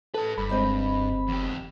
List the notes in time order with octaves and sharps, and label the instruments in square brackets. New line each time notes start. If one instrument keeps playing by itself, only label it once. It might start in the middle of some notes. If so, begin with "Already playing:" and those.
[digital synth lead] A4 [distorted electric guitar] B4 A5
[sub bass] F#1 [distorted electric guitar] G2 [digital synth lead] B5
[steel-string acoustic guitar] G#3 C4 D#5
[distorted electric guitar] E2 G4